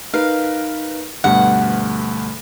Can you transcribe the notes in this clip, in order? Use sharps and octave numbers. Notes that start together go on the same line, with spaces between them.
D#4 A#4 B4 F5
D2 G2 B2 F#5